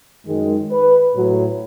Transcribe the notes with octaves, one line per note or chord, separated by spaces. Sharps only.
F#2 D#3 G#3
B4
A2 F#3